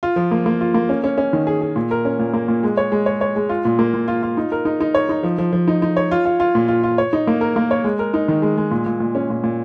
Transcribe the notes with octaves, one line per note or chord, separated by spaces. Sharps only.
F4
F3
A#3
A#3
F4
A#3
C#4
C#4
C#4
D#3
G#4
G#4
A#2
A#4
C#4
A#2
A#3
A#2
G#3
C#5
G#3
C#5
C#5
G#3
F4
A#2
A#3
A#2
F4
F4
D#4
A#4
D#4
D#4
C#5
D#4
F3
F3
F3
D#4
D#4
C#5
F4
F4
F4
A#2
F4
F4
C#5
D#4
A#3
A#4
A#3
C#5
G#3
A#4
D#4
D#3
G#3
G#3
A#2
A#2
A#2
C#4
A#2
A#2